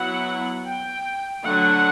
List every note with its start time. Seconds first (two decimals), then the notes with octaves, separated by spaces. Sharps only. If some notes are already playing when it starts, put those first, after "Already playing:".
Already playing: F#3 B3 E4 F#5
0.66 G5
1.45 D3 F#3 A3 F#5